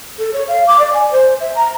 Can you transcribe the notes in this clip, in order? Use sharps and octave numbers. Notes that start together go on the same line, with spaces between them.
A4
C#5
F5
D6
D5
G#5
C5
E5
A#5